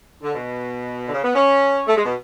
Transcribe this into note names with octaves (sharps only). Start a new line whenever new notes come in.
D3
B2
D3
C#3
B3
C#4
A3
G#3
B2